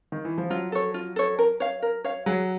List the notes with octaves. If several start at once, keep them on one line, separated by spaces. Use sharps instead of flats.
D#3
E3
F3
F#3 F4
A4 C#5
F4
A4 C#5
A#4
C#5 F5
A#4
C#5 F5
F#3 G#4